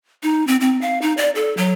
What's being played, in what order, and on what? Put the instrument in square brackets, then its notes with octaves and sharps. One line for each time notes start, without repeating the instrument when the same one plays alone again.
[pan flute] D#4
C4
C4
F5
D#4
D5
A4
F#3